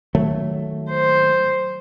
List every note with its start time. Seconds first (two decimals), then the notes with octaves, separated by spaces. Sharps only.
0.15 D#3 F#3 A3
0.90 C5